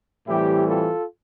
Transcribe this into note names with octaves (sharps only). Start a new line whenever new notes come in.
A2 E3 G3 C4 E4 G4
F4 A4